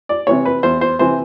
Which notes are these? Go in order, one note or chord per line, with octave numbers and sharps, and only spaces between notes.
D5
C3 E3 C#5
B4
E2 C5
C5
C3 E3 C5